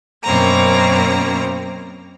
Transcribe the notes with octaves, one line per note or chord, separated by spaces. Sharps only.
F#2 B2 A#3 C4 A#5